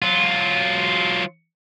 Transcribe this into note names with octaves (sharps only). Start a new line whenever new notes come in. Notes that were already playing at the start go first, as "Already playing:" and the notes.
F#3 F4